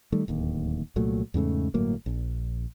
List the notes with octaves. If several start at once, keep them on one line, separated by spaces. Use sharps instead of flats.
D#3 G3 A3
D1 D#2
C2 A#2 F#3 A3
E2 G#2 C#3 A3
G1 A2 F#3 A#3
A#1